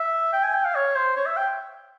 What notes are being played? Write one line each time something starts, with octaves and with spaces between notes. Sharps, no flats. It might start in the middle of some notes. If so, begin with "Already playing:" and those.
Already playing: E5
G5
G#5
G5
F5
C#5
C5
C#5
E5
G5